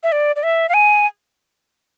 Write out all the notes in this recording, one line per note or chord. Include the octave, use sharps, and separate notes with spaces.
E5
D5
D5
E5
F5
G#5